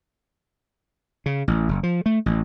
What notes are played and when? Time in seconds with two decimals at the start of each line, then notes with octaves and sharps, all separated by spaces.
1.26 C#3
1.48 A1
1.69 F#1
1.83 F3
2.06 A3
2.26 A1